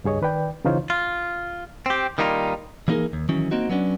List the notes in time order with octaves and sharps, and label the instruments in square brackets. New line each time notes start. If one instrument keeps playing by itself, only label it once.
[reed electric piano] C#2 G2 G#4 C#5 D#5
D#3 B4 D5 G5
C#3 E3 D#4 F4 C5 C#5
[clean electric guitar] F4
C4 G4
D#3 G3 A#3 D#4 F4
E3 G3 A#3 D#4 G#4 A#4
D#2
D#3 E3 F#3 C#4
A#3 C4 D#4 F#4
F#3 B3 C#4 D4